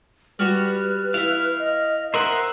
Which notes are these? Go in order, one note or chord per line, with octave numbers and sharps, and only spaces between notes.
G3 F#4 B4 F6
E4 E5 F5
D#5
D#4 A#4 C5 E5 F#5 A#5